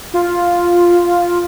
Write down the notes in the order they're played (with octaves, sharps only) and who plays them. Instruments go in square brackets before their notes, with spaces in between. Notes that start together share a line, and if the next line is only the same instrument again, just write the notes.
[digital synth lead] F4